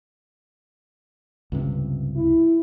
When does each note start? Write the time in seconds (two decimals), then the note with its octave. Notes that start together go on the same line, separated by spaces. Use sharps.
1.52 C#2 G2 C3
2.16 E4